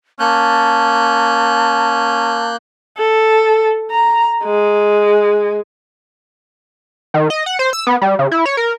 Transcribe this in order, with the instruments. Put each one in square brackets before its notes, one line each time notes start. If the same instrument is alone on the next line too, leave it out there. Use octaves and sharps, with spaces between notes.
[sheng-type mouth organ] A#3 F#6 G6 [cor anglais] C#4 [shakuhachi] A5
[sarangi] A4
A#5
G#3
[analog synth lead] D#3
D#5
F#5
C5
E6
B3
G3
C#3
E4
C#5
A#4